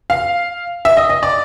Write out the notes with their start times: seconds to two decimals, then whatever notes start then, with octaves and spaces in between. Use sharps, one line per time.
0.10 F5
0.85 E5
0.97 D#5
1.10 D#5
1.23 D5